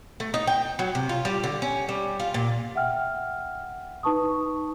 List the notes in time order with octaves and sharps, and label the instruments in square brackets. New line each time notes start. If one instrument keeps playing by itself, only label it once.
[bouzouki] A3
D#4
G5
F#3
C3
F4
G3
D3
C#4
G3
F4
A#2
[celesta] E5 F#5 G5 F6
D#4 B4 A5 C#6 D#6